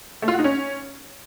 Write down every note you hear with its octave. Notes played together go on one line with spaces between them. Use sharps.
A3
F4
F#4
D#4
C#4